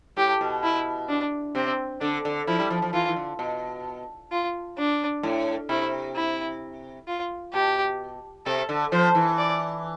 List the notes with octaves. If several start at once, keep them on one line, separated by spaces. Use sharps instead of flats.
A2 G4
B2
E4
D4
C3 C4
D3 D4
D3
F3 E4
G3
F3
F3
E3 F4
E3
D3
B2
F4
D4
A2
C3 E4
E4
F4
B2 G4
C3 A4
D3
F3 C5
E3
D5